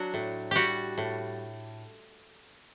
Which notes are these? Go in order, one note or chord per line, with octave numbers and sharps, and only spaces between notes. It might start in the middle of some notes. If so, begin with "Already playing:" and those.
Already playing: F#3 D4 F#4
A2
G3 F#4 G4
A2